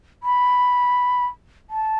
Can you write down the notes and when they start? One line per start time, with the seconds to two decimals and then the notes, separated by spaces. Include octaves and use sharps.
0.23 B5
1.70 A5